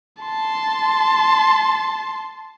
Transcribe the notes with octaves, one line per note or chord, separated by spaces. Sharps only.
A5 C6